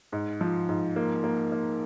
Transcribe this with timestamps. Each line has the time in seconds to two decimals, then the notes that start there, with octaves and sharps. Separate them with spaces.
0.12 G#2
0.41 F3
0.69 G#2
0.96 A#3
1.24 A#3
1.52 A#3